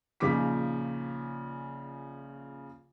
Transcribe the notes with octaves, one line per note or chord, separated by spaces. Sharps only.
A#1 C#3 F3 D#4 D6 B6